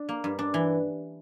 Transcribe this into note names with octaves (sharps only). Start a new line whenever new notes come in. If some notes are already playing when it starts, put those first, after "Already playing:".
Already playing: D4
A#3
G2
D4
E3